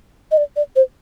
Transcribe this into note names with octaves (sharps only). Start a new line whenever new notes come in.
D#5
D5
D5
C5